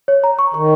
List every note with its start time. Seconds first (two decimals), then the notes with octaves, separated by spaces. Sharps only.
0.08 C#5
0.24 A#5
0.39 C#6
0.54 D#3 C#6